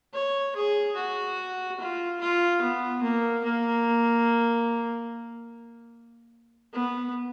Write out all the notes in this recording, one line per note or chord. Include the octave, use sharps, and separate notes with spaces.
C#5
G#4
F#4
F4
F4
B3
A#3
A#3
B3